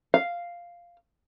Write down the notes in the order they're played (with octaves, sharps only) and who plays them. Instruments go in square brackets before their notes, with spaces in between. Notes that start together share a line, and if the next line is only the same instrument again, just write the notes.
[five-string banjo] F5